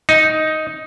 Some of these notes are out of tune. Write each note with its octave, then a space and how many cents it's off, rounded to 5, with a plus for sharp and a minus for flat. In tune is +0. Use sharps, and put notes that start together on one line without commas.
D#4 +5